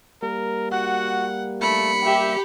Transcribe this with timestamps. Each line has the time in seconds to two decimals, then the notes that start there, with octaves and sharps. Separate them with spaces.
0.22 G3 A#3 A#4
0.72 F#4 F#5
1.62 A3 B5 C#7
2.05 G4 E5